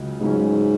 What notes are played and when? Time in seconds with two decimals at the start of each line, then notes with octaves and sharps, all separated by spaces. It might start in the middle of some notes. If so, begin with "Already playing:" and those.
Already playing: C#2 C#3 F#3
0.20 C#2 G#2 C#3 F#3 C#4